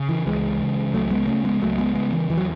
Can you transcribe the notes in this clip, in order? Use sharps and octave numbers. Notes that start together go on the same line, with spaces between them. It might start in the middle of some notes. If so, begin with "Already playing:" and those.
Already playing: C#3
E3
C#2 E3 G#3
C#3
C#2 F#3 A3
G#3 B3
C#3 A3 C#4
G#3 B3
C#2 F#3 A3
G#3 B3
C#3 G#3 B3
E3
E2 E3
F#3